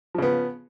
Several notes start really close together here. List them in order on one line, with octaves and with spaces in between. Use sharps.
F3 C#3 B3